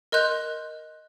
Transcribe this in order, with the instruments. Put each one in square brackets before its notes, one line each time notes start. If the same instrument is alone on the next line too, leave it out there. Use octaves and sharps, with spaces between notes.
[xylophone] A#4 D#5 C6 F#6 G6